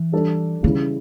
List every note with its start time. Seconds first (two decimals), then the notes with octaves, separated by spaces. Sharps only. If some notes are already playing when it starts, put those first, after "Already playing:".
Already playing: E3
0.12 G3 D4 A4
0.63 C#3 E3 G3 C#4